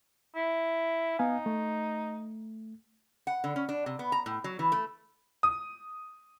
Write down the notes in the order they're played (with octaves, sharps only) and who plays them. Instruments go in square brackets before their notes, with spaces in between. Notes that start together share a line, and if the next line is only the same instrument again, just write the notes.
[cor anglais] E4
[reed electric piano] B3 F5 G#5 [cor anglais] D#4
[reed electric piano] A3
[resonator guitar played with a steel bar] F#5
D3
C#4
D4
C3
B3
A#5
A2
F#3
E3
A3
[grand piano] D#6